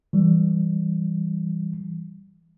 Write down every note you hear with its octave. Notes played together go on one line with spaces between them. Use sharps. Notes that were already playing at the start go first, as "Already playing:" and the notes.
E3 G3